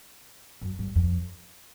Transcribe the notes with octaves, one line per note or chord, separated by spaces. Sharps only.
F#2
G2
F2